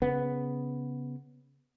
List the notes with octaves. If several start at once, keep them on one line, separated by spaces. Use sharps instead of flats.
C#3 B3